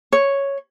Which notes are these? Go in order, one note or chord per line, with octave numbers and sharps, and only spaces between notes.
C#5